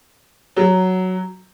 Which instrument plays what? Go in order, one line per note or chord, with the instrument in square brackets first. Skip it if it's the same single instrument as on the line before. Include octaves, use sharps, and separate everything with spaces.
[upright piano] F#3